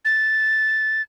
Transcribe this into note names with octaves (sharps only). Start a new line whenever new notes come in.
A6